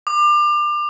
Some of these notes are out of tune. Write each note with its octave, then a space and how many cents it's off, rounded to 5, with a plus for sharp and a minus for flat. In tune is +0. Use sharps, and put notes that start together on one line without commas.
D6 +30